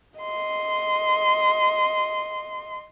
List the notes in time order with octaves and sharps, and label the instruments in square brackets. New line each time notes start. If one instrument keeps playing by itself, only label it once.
[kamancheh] D#5 C6